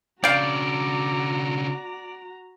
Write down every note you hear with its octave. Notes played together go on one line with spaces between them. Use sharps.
C#3 D4 F#4 D5 F5 G5 A#5